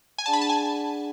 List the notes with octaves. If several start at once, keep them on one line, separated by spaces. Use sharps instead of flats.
G#5
D4 G#4 D5 F#5 A5
B5
A5
G#5